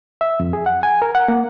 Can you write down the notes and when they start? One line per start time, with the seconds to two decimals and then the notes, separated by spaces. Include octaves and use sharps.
0.21 E5
0.40 F2
0.53 G#4
0.66 F#5
0.83 G#5
1.02 A#4
1.15 F#5
1.28 A#3